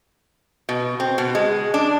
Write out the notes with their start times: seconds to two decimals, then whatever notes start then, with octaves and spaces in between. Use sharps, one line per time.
0.69 B2
1.00 C4
1.18 B2
1.35 G#3
1.74 D4